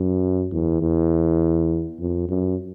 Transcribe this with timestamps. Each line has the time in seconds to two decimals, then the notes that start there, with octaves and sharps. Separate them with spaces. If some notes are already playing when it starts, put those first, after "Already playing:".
Already playing: F#2
0.52 E2
0.81 E2
2.00 F2
2.29 F#2